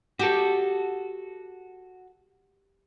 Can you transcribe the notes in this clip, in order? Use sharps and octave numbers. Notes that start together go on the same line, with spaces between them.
F#4 G4 A4